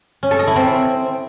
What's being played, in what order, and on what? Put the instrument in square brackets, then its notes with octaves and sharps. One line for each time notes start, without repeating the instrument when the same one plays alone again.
[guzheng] C#4
A4
D#5
E4
C4